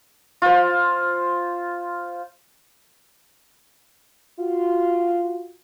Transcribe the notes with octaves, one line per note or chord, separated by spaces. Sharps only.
F4 C5
F4 F#4